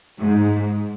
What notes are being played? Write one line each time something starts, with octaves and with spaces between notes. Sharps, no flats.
G#2